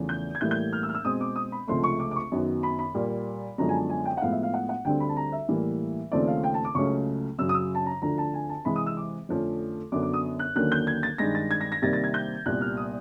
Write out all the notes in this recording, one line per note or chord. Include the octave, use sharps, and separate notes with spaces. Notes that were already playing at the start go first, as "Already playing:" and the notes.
Already playing: E2 C#3 F3 A3
G6
G#6
A2 E3 G3 A#3 G6
G6
F6
E6
F6
E6
B2 G#3 C4 D#6
D6
D#6
B5
C#2 C3 F3 A3 C6
C#6
D6
D6
C#6
F#2 D#3 F#3 B3
B5
B5
A#2 G3 A#3
F#2 D3 F3 G#3 B3 A#5
G#5
A5
G#5
G5
F#5
A2 F3 G#3 B3 F5
E5
F5
F#5
F#5
D2 D3 G3 C4 G5
B5
A5
A#5
E5
A2 E3 G3 A#3
D#2 C#3 F3 A3 C4 D5
F5
G5
A5
D6
C#2 C#3 F#3 A3 C#4 C#6
F#2 C#3 F#3 E6
D#6
E6
A5
A#5
D2 D3 F3 A#5
A5
G#5
A5
C3 E3 G#3 B5
D#6
E6
D6
F2 D3 F3 A3 C#4
F#2 D3 F#3 B3 D6
D6
D#6
F#6
D#2 D3 F#3 A#3 C#4 F#6
G6
G#6
A6
G2 D#3 G#3 A#6
A6
G#6
A#6
A#6
C3 D#3 G3 A#3 A6
A6
G#6
G6
C2 A#2 G3 B3 F#6
F6
D#6